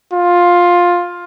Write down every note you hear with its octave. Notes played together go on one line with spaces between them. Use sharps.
F4